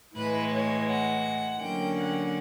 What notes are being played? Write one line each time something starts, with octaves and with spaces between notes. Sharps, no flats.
A2 E3 G#3 B4
C#5
F#5
D3 F#3 A#3 C#4 G5
F#5